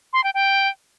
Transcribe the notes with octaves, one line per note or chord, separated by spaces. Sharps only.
C6
G5
G5